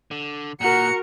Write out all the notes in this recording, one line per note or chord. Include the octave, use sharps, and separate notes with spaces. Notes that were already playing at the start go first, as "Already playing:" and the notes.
D3
A#2 F#4 A#4 F#5 A#5 C#7